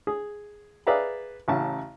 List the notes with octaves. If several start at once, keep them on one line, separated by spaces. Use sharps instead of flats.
G#4
G#4 B4 D5 E5 F5 A#5
A1 C#3 E4 A5